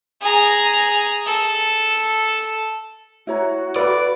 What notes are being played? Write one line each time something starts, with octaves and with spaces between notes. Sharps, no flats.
G#4 A#5
A4
E4 F#4 C#5 A#5
A4 B4 D5 F5 B5